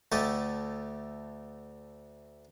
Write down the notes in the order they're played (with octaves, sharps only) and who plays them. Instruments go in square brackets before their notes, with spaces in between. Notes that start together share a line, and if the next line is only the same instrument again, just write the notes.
[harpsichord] D2 A3 G4 A4 D#5